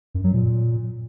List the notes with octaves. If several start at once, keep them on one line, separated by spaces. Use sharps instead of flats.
F#2
F#3
A#2